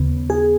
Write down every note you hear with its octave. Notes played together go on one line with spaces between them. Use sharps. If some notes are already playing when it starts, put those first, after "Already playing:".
Already playing: D#2 C#3 B3
G#4